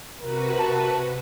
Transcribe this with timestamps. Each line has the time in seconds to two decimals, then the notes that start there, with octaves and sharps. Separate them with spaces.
0.21 C3 F#4 A#4 B4
0.59 A5